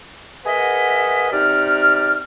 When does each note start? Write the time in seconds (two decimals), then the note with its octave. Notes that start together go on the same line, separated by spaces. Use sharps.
0.45 G#4 A#4 B4 D#5 E5 F#5
1.32 C3 D#4 G4 D5 F6